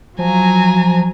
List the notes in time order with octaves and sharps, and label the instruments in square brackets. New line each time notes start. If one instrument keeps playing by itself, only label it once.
[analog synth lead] F3 [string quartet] F#3 G#5 A#5